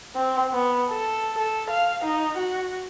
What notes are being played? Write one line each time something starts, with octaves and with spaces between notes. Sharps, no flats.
C4
B3
A4
A4
F5
D#4
F#4